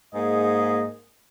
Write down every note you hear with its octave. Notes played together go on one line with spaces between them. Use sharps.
G#2 A#3 G#4 D#5